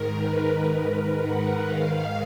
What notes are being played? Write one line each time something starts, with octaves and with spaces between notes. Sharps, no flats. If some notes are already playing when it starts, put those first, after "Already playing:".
Already playing: G#2 D#3 A#4
B4
F#5
G#2 D#3 F5